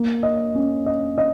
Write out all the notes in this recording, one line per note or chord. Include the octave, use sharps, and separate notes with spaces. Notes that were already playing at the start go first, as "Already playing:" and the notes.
Already playing: A#3
D#5
C#4
D#5
D#5